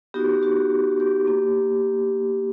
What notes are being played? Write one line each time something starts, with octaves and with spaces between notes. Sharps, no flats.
B3 D#4 F#4 G4
F#4
G4
A#3 G4